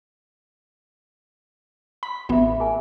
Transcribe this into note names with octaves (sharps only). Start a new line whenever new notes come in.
B5
A1 B3 F4 G#4 E5
G#4 A#4 G#5